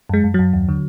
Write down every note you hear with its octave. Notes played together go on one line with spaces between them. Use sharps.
F#2 G#3
F#2
F#2 F#3
D#2
D3